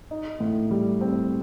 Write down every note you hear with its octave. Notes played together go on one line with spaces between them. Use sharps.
D#4
A2
G3
C4